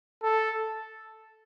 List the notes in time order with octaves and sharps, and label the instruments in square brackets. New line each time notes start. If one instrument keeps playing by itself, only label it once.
[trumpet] A4